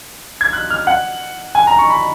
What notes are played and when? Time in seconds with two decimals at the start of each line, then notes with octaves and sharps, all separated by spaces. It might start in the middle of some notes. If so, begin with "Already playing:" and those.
0.41 G#6
0.53 F#6
0.71 F6
0.87 F#5
1.55 G#5
1.67 A#5
1.79 C#6
1.90 B5